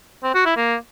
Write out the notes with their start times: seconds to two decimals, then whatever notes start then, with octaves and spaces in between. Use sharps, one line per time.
0.23 C4
0.34 F#4
0.45 E4
0.57 A#3